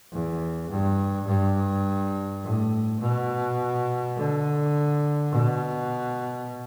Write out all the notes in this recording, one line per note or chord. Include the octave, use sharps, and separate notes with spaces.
E2
G2
G2
A2
B2
D3
B2